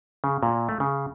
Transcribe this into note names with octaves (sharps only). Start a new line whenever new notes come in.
C#3
A#2
A3
C#3